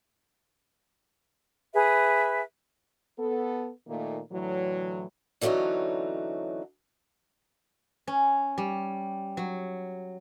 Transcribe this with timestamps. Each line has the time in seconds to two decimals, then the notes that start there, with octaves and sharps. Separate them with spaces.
1.74 G#4 B4 E5
3.19 B3 A4
3.88 A#2 D#3 A3 A#3 D#4
4.32 A2 D3 E3 F#3
5.41 D3 E3 F#3 A3 C#4 D#4
8.07 C#4
8.58 G3
9.37 F#3